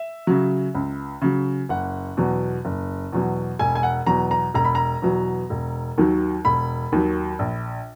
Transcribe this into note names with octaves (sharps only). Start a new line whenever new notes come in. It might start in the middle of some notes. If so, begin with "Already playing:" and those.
Already playing: E5
C#3 F#3
C#2
C#3 F#3
F#1 F#5
E2 B2 F#3
F#1
E2 B2 F#3
E1 G#5
G#5
F#5
E2 B2 F#3 A#5
A#5
E1 A#5
B5
A#5
E2 B2 F#3
E1
D#2 D#3 F#3
E1 B5
D#2 D#3 F#3
A#1